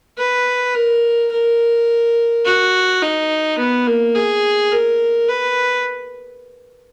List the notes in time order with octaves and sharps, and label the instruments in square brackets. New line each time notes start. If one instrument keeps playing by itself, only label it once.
[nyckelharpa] B4
A#4
A#4
F#4
D#4
B3
A#3
G#4
A#4
B4